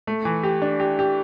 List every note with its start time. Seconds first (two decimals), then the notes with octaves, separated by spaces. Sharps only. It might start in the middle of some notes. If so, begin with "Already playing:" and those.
0.07 A3
0.25 E3
0.43 G4
0.62 D4
0.80 G4
0.99 G4